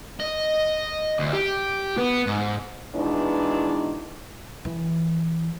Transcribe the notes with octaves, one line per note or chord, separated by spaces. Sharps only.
D#5
D2
G4
B3
G#2
B2 D#3 E3 G#3 D4 E4
E3